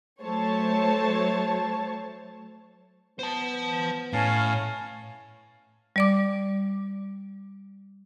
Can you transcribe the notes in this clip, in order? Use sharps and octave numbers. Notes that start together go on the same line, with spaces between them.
F#3 A3 C5 C#5 A5
B3 C5 A5
A2 C#4 F5 A5
G3 D5 D6